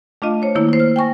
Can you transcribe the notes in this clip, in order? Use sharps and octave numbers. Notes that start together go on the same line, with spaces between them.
A3 D4 F4 D#5 F5
C5 C#5
D#3 A#3 E4
E4 C5
F6
G5 G#5 C#6 A#6